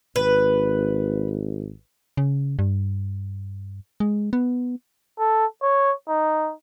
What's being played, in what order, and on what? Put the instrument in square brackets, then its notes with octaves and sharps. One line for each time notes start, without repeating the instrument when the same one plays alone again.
[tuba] G#1 [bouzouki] B4
[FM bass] C#3
G2
G#3
B3
[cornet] A4
C#5
D#4